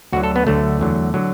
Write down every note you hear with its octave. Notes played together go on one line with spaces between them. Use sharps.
D2 D3 F#3 F#4
A4
B3
D2 D3 F#3 A3
E2 D3 F#3
D3 F#3